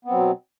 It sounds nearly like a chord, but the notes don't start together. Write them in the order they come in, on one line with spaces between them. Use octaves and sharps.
B3 C4 F#3 B2